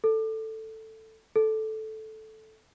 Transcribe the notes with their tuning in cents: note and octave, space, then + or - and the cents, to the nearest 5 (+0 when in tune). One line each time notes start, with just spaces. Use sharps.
A4 +5
A4 -10